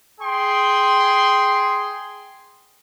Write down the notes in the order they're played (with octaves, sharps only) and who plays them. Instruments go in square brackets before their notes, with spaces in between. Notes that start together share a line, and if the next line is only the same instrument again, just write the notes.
[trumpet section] G#4 G5 C6